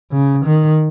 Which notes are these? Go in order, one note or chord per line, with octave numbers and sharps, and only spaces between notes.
C#3
D#3